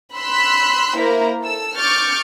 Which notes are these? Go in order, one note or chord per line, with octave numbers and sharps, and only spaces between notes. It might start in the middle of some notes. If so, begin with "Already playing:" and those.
B5 C6 E6 F#6 B6
A#3 E4 A#4 C5
A4 E6
C#6 D6 F6 G6 A6